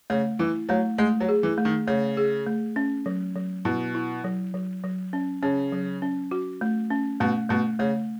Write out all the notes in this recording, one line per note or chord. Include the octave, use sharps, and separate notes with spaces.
C#3 A3
E3 E4
F#3 A3
G#3 A3
F#3
G#4
E3
A3
D#3
C#3 A3
G#4
A3
C#4
F#3
F#3
B2 E4
E4
F#3
F#3
F#3
C#4
C#3 C#4
F#3
C#4
F#4
A3
C#4
B2 A3
B2 A3
C#3 A3